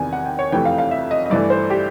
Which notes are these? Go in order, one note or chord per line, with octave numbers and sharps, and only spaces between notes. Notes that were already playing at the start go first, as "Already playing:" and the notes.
Already playing: E2 C3 D#3 G#5
F#5
G5
C#5
F2 C3 E3 A3 G5
F5
F5
E5
D#5
D#5
G2 E3 A3 D5
C5
G4